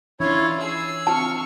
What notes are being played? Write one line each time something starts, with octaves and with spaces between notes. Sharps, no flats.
E3 C#4 D4 E4 F4 C#5
G#4 E6
C4 D#4 F4 A5 C#6 F6